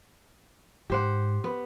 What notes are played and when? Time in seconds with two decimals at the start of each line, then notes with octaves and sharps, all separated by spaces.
0.90 G#2 G4 C5 F#5
1.44 B3